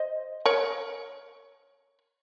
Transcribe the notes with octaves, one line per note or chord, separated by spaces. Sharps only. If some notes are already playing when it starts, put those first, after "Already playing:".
Already playing: C5 D#5
A#4 C#5